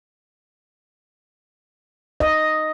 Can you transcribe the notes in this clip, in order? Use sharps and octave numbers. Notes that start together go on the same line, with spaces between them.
D#5